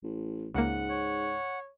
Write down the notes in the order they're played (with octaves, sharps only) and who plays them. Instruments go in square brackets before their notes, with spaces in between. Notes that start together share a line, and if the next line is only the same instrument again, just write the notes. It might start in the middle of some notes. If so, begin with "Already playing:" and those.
[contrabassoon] A1
[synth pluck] C#2 A#3 [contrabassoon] G#2 [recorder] F#5
[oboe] C#5